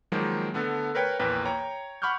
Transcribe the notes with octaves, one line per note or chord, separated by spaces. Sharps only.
D#3 F3 F#3 G#3 A#3
D3 A3 B3
A#4 B4 C#5 G5
A#1 E2 A#3 B4 G5
C#5 G5 A#5
F#5 B5 C#6 D6 F6 G6